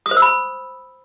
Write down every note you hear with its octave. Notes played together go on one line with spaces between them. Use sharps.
D#6
C5
E6
B5